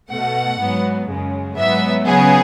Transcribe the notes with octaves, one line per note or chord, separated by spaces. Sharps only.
B2 A3 F#5
G#2 F#3 B3
F#2 C#3 G#3
G#2 F#3 B3 E5
C#3 F#3 B3 G#4